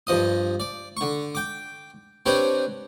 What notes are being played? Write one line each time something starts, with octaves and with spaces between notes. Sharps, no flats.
G2 F3 D#5 D#6
D5
D3 C#6
G5 D6
C4 D4 G4 B4 C#5